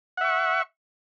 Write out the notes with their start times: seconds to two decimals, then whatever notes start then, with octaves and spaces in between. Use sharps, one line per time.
0.17 F#5
0.21 E5
0.24 C#6